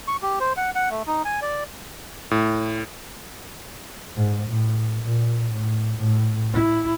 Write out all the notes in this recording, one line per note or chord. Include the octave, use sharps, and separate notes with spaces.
C#6
G4
C5
F#5
F#5
A3
D#4
G#5
D5
A2
G#2
A2
A#2
A2
A2
E4